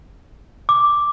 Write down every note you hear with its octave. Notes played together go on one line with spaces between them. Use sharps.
D6